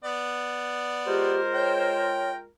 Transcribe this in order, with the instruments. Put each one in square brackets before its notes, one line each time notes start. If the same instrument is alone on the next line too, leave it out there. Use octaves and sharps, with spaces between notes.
[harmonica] B3 D5
[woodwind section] G#3 F4 A#4 [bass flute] G4 [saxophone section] C5
[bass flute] C#5 [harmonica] G5